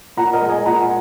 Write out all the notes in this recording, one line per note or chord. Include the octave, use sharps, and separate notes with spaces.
A#2 F#5 A#5
A#4 D#5
G#3
D#5 G#5
A#2 F#5 A#5